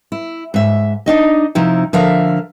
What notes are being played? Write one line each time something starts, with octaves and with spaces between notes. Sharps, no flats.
E4
G#2 E5
D4 D#4 D#5
C3 F3 D#4 E4
D3 F3 A#4 E5 F5